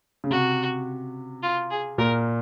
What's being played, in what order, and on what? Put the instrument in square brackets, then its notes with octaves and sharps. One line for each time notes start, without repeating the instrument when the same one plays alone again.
[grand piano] C#3
[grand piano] C3 [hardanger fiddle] F#4
[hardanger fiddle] F4
G#4
[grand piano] A#2 [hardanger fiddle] A#4